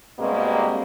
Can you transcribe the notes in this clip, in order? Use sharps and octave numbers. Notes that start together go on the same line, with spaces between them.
G2 B2 G3 G#3 A#3 C4